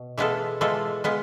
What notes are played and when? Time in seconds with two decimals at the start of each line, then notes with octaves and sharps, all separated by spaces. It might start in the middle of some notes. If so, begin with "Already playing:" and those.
Already playing: B2
0.18 E3 G#3 B3 F4 A4
0.61 E3 G#3 B3 F4 A4
1.04 G#3 B3 F4